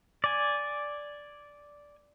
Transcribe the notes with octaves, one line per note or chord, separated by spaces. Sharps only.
D5 G#5